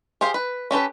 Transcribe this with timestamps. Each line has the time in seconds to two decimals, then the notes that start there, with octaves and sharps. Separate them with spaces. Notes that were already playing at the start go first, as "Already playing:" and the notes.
0.21 G4 G#4 C5 F5
0.34 B4
0.71 C#4 G4 A4 B4